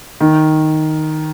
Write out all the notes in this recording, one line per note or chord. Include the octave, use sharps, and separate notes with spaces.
D#3